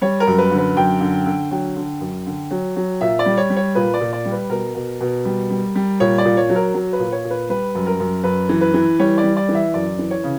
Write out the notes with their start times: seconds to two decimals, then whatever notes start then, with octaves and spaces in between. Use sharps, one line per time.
0.01 G3 C#5
0.20 A#4
0.27 F#2
0.38 B4
0.51 D3
0.58 B4
0.76 F#2 G5
1.01 D3
1.26 D3
1.51 F#3 G5
1.76 D3
2.01 F#2
2.26 D3
2.51 F#3
2.76 F#3
3.01 A#2 E5
3.19 D5
3.26 G3
3.37 C#5
3.50 G3
3.56 C#5
3.75 A#2 B4
3.94 D5
4.00 A#2
4.13 D5
4.25 G3
4.32 B4
4.50 B2 A#4
4.75 B2
5.01 B2
5.25 G3
5.50 G3
5.75 G3
6.00 A#2 C#5
6.18 D5
6.25 A#2
6.37 C#5
6.49 F#3
6.55 A#4
6.74 F#3
6.93 B4
6.99 A#2
7.12 C#5
7.24 A#2
7.30 B4
7.49 G3 B4
7.75 F#2
7.86 A#4
8.00 F#2
8.24 F#2 B4
8.49 E3
8.61 B4
8.74 E3
8.99 G3 C#5
9.18 D5
9.23 G3
9.37 D5
9.49 E3
9.54 E5
9.74 F#2 D5
9.99 E3
10.11 C#5
10.24 C#3